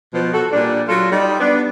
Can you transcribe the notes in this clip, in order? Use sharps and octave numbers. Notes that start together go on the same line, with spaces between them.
B2 F3
F#4 A4
A#2 G3 D4
F#3 F4 A4
G3 D#4
B3 D4